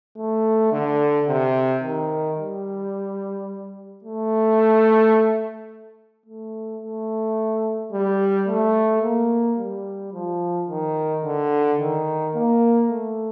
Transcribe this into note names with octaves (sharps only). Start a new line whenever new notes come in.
A3
D3
C3
D#3
G3
A3
A3
A3
G3
A3
A#3
G3
F3
D#3
D3
D#3
A#3
A3